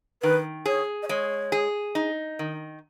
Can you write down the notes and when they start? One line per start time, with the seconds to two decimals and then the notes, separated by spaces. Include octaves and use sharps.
0.22 D#3 B4
0.65 G#4 C#5
1.03 D#5
1.09 G#3 C#5
1.52 G#4
1.95 D#4
2.39 D#3